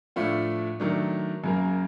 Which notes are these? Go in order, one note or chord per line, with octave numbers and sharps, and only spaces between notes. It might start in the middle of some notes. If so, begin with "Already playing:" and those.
A2 F3 A3 D4 F4
D#3 F#3 A3 D4
F#2 C#3 F#3 A#3